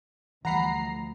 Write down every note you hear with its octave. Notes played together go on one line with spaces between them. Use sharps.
D2 E3 F3 G3 F#5 A#5 B5 C7